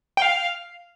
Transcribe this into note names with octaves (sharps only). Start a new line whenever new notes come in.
G5
F5